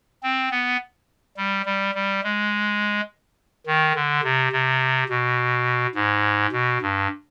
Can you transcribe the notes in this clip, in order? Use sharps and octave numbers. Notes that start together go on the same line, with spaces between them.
C4
B3
G3
G3
G3
G#3
D#3
D3
C3
C3
B2
G#2
B2
G2